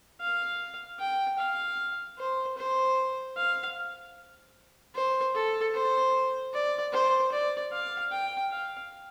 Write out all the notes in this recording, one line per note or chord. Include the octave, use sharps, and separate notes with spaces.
F5
G5
F5
C5
C5
F5
C5
A4
C5
D5
C5
D5
F5
G5
F5